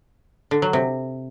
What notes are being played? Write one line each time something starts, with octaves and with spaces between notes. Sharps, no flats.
D3
F#3
C3